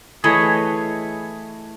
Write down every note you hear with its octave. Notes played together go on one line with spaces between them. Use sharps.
E3 A3 G#4 B4 C#5 D#5